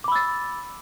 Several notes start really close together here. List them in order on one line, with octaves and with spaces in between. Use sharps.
D6 B5 E6 A6